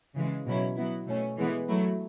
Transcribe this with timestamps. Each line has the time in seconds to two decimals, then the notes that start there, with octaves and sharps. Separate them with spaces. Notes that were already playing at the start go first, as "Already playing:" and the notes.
0.15 C#3 E3 G#3
0.45 B2 F#3 C#4 E4
0.76 F#3 B3 E4
1.06 B2 A3 C#4
1.37 E3 G#3 B3
1.68 F#3 A3 E4